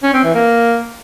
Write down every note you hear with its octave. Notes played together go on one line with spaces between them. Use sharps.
C#4
C4
E3
A#3